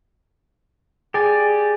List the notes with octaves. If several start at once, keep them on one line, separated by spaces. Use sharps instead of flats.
G4 G#4 D5 G#5